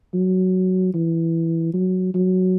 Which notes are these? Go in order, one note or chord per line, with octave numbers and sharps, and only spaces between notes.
F#3
E3
F#3
F#3